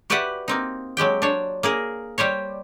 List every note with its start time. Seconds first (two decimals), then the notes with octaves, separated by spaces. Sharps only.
0.10 F#4 G4 B4 D5 E5 F#5
0.48 A#3 C4 D#4
0.97 F#3 G#3 G4 G5
1.22 D4 C5 C#5
1.63 A#3 G#4 A#4
2.18 G3 G4 C5 C#5